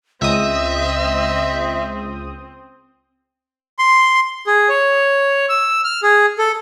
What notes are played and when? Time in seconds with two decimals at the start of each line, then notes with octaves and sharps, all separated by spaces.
0.22 C#2 C4 D#5 E5 D#6
3.79 C6
4.47 G#4
4.69 C#5
5.49 E6
5.84 F6
6.03 G#4
6.39 A4